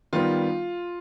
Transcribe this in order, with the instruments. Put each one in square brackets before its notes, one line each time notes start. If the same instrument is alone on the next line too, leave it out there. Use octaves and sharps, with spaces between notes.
[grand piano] D#3 G3 B3 F4